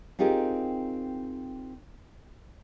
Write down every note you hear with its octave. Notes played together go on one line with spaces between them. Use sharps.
C4 D#4 F4 G4 G#4 A#4